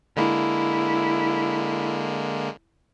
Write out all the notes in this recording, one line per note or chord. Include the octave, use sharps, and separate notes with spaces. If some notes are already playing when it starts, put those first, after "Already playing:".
D3 G#3 A#3 E4